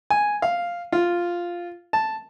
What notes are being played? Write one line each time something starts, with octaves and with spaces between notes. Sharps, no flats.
G#5
F5
F4
A5